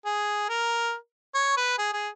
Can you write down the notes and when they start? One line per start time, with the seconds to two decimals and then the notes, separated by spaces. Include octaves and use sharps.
0.05 G#4
0.49 A#4
1.35 C#5
1.57 B4
1.78 G#4
1.93 G#4